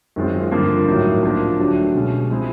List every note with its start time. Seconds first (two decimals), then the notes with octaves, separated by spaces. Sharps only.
0.16 F#2 D#3 G#3 C4 F4
0.51 G2 D3 F3 A#3
0.87 A2 F#3 A#3 D#4
1.23 F3 A#3 D4
1.58 D3 F#3 A3 D4 G4
1.95 B2 G#3 C#4
2.30 F3 G#3 C4 E4 G#4